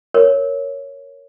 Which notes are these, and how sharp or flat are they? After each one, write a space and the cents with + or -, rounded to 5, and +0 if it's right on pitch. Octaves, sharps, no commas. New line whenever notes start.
A#4 +0 C#5 +0